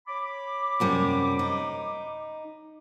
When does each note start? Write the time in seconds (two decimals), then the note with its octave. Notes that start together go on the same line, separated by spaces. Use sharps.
0.08 C#5 B5 D6
0.80 F#2 C3 G3
1.39 D#4